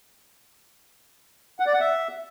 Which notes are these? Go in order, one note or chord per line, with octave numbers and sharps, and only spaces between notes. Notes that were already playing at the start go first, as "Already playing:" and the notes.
F#5
D5
F#5
E5